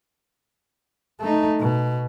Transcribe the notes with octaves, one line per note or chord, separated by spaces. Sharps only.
A3 D#4
B2